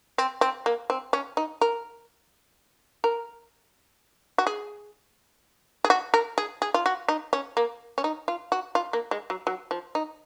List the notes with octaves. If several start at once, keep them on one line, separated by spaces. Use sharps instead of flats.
C4
C4
A#3
C4
C#4
D#4
A#4
A#4
F#4
G#4
G#4
F#4
A#4
G#4
G#4
F4
F#4
D#4
C#4
A#3
C#4
D#4
F4
F#4
F4
A#3
G#3
F#3
F#3
F3
D#4